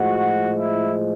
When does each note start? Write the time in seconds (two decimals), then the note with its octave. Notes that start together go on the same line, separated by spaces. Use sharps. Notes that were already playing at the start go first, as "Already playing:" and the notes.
Already playing: A2 F3 G#3 F#4
0.59 E4